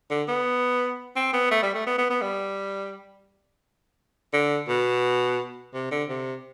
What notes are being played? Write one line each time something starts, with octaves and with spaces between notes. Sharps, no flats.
D3
B3
C4
B3
A3
G3
A3
B3
B3
B3
G3
D3
B2
C3
D3
C3